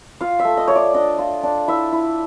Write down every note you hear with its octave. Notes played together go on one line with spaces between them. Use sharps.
F4 F5
E5
A3
D#5
A3 C#5
D5
D4 D#5
F4
D4
E4 E5
E4